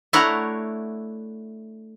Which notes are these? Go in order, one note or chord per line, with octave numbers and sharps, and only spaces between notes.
A3 D4 E4 A#4 C#5 F#5